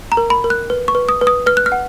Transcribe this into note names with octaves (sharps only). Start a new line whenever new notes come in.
A#5
A#4
B5
A#4
F#6
B4
C#6
B4
D#6
B4
D#6
B4 F6
F#6
F6
F#5